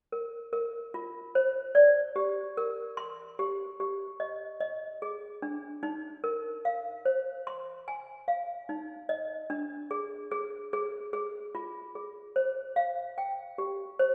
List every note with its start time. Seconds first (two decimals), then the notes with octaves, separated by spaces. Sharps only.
0.12 A#4
0.53 A#4
0.94 F4
1.35 C5
1.75 D5
2.16 G4
2.57 A#4
2.97 C6
3.39 G4
3.80 G4
4.20 D#5
4.60 D#5
5.02 G#4
5.42 D4
5.83 D#4
6.24 A#4
6.65 F5
7.05 C5
7.47 C6
7.88 G#5
8.28 F5
8.69 D#4
9.09 D#5
9.50 D4
9.91 G#4
10.31 G#4
10.73 G#4
11.13 G#4
11.55 F4
11.95 G#4
12.36 C5
12.76 F5
13.18 G5
13.58 G4
13.99 C5